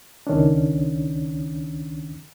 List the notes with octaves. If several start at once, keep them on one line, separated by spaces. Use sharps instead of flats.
C#2 D#3 C#4 D4